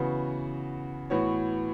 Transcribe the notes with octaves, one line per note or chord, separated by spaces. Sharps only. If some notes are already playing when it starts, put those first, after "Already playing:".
Already playing: C#3 E3 B3 F#4
A2 E3 B3 F#4 C#5